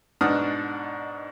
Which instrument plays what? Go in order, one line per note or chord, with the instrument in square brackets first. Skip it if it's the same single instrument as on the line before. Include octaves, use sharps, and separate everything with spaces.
[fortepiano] G#2 B2 D4 F#5 D#6 F6